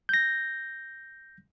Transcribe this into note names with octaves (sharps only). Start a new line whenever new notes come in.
G6 A#6